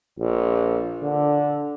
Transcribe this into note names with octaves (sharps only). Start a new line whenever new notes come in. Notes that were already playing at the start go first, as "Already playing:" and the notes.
A#1
D3